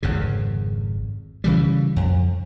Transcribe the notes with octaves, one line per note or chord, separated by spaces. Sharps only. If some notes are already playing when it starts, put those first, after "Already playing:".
G#1 F2 C#3
C#3 E3 G3
F2